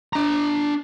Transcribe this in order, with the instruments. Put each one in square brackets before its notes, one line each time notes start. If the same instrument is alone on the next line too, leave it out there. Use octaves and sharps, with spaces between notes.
[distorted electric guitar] D4 A#5